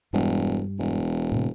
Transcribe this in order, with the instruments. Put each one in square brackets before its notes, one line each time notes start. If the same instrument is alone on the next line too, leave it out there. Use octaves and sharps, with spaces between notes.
[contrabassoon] E1 [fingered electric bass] G2 G3
[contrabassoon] E1
[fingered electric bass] A2 C3